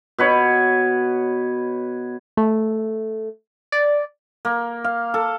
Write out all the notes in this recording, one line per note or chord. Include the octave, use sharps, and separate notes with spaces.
B2 B4 C#5
A3
D5
A#3
F5
A4